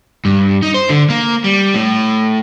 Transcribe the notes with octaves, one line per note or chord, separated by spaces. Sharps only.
G2
D#4
C5
D3
A#3
G3
A2